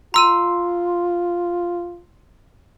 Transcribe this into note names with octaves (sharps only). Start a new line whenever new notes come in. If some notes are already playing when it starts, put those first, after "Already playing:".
F4 A#5 C6 E6 D#7